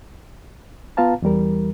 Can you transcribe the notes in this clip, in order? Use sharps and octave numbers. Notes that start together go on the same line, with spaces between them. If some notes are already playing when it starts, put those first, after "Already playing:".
B3 F4 B4 F5 A5 A#5
E2 E3 G3 A#4